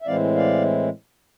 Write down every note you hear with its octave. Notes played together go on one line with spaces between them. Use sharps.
E5
A2 E3 G#3 C4 E4 D5 F5
D5 F5